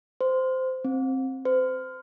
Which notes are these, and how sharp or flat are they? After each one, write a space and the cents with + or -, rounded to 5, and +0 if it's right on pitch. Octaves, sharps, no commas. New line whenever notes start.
C5 -15
C4 +10
C5 -35